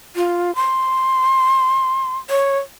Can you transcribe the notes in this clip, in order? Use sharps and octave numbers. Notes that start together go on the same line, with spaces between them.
F4
C6
C#5